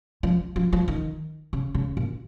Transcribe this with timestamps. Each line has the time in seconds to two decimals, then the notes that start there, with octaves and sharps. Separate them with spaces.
0.23 F3
0.56 F3
0.73 F3
0.88 D#3
1.53 C#3
1.74 C#3
1.97 A#2